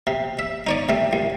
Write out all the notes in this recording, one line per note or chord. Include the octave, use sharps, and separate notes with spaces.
C3
E5
D#4 C#5 D5
C3 A3
C2